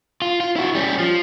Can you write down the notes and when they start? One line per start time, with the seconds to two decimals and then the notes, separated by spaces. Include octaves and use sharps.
0.22 F4
0.40 F4
0.56 E4 F#4
0.75 G3 C#4
0.99 F3